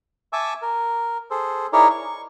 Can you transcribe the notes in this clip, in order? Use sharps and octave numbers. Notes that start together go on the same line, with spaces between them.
E5 G#5 A5 C#6 D6 E6
A#4
G#4 A4 C5
D#4 E4 G#4 A#4 C#5 D5
C#6